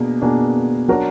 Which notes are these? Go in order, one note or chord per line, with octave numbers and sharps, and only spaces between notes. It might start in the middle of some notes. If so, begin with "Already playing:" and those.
Already playing: B2 A#3 D4 G#4
B2 A#3 D4 G#4
F#3 D4 F#4 A#4